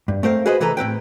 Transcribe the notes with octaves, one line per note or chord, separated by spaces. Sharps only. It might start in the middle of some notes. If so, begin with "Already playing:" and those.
G2
A3 C4 A#4 F5
F#4 G#4 B4 C5 D#5
C3 E3 A4 B4 A#5
A2 C4 B4 G5